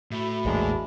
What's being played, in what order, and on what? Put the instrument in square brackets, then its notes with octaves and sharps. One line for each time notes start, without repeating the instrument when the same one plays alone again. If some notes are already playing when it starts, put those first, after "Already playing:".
[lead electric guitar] A2 A3 [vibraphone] F#4 E5 B5
[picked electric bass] A#1 E2 A#2 [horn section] E3 G#3 D4